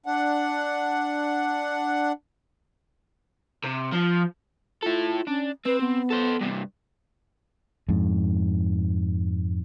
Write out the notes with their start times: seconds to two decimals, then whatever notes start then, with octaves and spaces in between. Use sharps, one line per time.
0.06 D4 F#5
3.64 C3
3.93 F3
4.83 E4 F4 A4
5.28 C#4 D4
5.66 C4 B4
5.81 B3
6.10 A4 C5
6.41 G2 C3
7.89 F2 G#2